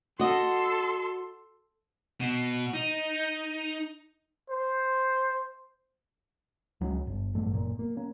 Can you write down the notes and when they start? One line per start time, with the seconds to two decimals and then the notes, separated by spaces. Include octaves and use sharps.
0.19 F#4 A4 D#5 C6
2.20 B2
2.74 D#4
4.50 C5
6.81 C#2 F#3 G#3 C#4
7.07 G1
7.35 A1 G2 A3
7.54 F#1 A#2
7.79 A#3
7.97 A#3 C#4